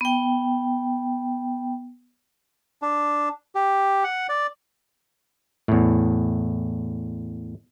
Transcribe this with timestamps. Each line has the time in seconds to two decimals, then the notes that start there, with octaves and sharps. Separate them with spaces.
0.01 B3 G5
2.82 D4
3.55 G4
4.04 F#5
4.29 D5
5.68 E2 A2